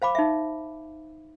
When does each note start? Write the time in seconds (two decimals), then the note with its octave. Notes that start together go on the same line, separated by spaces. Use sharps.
0.02 C5 F5 B5 D6
0.15 D#4 E5